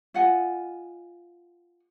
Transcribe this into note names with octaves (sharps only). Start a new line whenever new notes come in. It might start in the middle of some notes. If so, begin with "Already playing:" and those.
F4 D#5 F#5 G#5